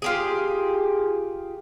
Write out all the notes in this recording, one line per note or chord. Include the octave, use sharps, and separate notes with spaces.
F4 G4 G#4